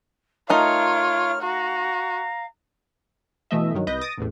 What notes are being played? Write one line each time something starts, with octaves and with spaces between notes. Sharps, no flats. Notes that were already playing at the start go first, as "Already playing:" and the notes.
A3 D#4 F4 A#4 C#5 F6
F#4 F5 A#5
B2 E3 A3 D#5 E5
G2 D#3 F#3
C2 B4 D#5 G6 A#6
D#6 A6 A#6 D7
A1 E2 A2